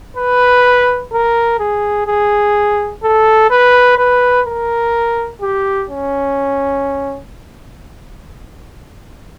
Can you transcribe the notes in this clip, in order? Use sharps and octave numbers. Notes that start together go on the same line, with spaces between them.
B4
A#4
G#4
G#4
A4
B4
B4
A#4
G4
C#4